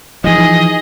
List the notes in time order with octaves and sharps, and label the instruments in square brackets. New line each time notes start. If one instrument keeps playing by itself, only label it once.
[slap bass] E3 F3 [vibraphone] D#4 [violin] G#4 [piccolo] D#5